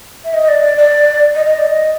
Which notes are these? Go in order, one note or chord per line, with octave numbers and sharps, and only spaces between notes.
E5
D#5
D5
D5
D5
D#5
D#5
D5
D#5